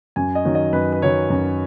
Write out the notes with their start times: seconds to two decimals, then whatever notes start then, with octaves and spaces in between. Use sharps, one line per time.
0.16 F#2 G#5
0.35 D#5
0.45 D#3 F#3 C#4
0.55 D#5
0.73 F#2 B4
0.92 B4
1.02 D#3 F#3 C#4 C#5
1.30 F#2